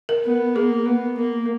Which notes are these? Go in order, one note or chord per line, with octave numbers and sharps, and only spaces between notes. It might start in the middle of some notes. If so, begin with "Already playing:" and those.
A#4
B3
A#3 G#4
B3
A#3